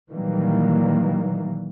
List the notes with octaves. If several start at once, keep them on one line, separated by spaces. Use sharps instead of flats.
A#2 D#3 E3 F#3 G3 A#3